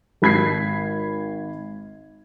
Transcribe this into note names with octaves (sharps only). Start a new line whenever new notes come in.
G#1 B5 G#6 B6 C7